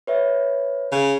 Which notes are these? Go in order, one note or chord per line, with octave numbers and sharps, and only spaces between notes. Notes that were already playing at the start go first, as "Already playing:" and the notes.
B4 C#5 E5
C#3